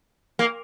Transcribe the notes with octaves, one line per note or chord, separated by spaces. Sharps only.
A#3